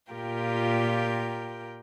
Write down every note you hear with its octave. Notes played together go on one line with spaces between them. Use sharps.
A#2 F4 G4 A#4 G5